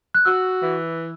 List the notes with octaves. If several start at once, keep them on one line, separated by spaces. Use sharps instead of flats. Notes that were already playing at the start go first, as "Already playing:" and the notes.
F#6
F#4 E6
E3